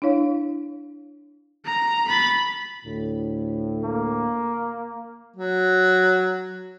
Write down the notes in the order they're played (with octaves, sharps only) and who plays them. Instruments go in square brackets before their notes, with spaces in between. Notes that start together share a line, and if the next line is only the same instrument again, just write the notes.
[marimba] D4 E4 C#5 F5
[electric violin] A#5
B5 A6
[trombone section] D2 A2
[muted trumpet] A#3
[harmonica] F#3